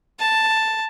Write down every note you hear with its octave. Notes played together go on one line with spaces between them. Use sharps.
A5